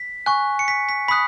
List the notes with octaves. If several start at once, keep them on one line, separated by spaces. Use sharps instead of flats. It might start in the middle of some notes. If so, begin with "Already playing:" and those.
Already playing: B6
G#5 C#6 F#6
C#7
B6
B6
B5 D#6 F#6 B6